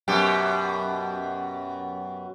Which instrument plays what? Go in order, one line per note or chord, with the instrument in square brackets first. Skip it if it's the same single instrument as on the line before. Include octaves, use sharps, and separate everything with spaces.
[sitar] F#2 B2 G4